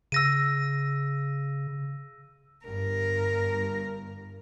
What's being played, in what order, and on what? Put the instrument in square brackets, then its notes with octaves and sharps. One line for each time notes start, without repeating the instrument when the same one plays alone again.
[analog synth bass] C#3 [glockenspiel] E6 A#6 D#7
[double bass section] G1 G2 [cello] A#4